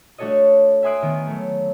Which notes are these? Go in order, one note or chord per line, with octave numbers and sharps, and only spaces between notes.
A3 D4 F#4 A4 C#5 D#5
E5 G#5 C6 D#6 F#6 D7
D#3 B3 D7
F#3 A3